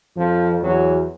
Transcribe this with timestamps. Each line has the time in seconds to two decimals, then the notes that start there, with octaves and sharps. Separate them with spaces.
0.16 F2 F3
0.62 E2 F#3